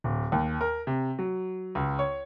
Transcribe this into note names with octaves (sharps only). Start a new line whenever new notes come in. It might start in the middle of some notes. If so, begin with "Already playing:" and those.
D1
D#2
A#4
C3
F#3
C#2
C#5